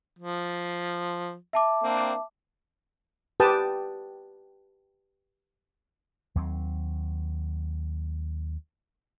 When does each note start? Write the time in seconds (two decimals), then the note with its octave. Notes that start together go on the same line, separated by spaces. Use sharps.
0.19 F3
1.53 E5 A5 D6
1.83 A#3 C4 D4
3.40 G4 B4 G5 A5 D#6
6.35 D#2 F#3 C4